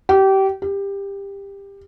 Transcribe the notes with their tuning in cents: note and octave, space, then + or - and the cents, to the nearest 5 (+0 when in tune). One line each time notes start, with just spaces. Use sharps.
G4 -25
G4 +20